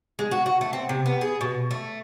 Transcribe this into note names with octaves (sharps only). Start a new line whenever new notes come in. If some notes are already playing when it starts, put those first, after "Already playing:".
G#3
F#4
F#4
A3
C4
C3
B3
G#4
B2
A3